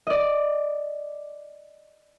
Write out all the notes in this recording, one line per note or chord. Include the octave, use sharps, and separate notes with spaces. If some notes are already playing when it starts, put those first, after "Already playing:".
D5 D#5